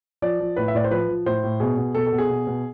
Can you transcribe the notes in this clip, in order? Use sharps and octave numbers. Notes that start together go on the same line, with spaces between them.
F3 D5
F3
A2 B4
E5
A2 D5
C5
F3 B4
F3
A2 C5
A2
B2 G#4
B2
B2 A4
A4
B2
G#4
B2
B2